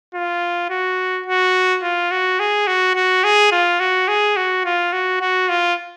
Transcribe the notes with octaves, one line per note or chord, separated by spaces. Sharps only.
F4
F#4
F#4
F4
F#4
G#4
F#4
F#4
G#4
F4
F#4
G#4
F#4
F4
F#4
F#4
F4